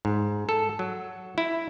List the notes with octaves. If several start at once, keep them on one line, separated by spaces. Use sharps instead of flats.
G#2
A4
F#3
E4